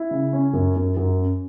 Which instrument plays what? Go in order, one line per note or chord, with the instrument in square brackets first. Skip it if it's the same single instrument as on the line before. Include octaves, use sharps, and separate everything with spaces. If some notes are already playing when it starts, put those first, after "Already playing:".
Already playing: [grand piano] E4
C#3
C#4
F#2
F#2
F#2
C#4